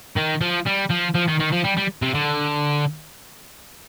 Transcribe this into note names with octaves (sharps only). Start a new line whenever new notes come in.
D#3
F3
G3
F3
F3
D#3
D#3
F3
G3
G3
C3
D3